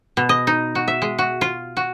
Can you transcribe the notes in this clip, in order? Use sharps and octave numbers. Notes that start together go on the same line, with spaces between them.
B2
D#5
D#4
F#4
E5
G#3
F#4
F4
F#4